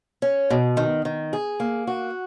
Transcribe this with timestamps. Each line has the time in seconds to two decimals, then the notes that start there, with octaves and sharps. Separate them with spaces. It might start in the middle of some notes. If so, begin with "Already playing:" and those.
0.22 C#4
0.50 B2
0.77 D#3
1.05 D#3
1.33 G#4
1.60 A#3
1.87 F#4